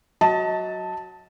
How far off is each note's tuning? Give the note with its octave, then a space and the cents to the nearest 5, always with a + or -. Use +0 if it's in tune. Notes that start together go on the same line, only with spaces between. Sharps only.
F#3 +0 D#5 +30 A5 +0